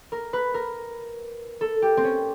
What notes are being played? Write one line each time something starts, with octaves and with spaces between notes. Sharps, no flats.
A#4
B4
A#4
A4
G4
C4
C#4